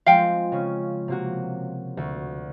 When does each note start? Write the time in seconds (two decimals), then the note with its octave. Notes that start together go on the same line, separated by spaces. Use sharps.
0.06 F3 G#3 C4 F5 G5
0.52 C#3 C#4
1.08 C3 A#3 F#4
1.97 D2